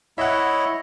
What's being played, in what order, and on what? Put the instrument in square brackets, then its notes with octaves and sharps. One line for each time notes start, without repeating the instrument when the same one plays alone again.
[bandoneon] E4 C#5 D#5 [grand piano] E5 F#5